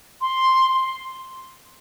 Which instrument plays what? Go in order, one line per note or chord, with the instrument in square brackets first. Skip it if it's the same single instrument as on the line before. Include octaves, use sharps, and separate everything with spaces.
[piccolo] C6